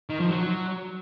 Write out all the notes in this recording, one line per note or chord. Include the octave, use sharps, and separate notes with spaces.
D#3
F3
F#3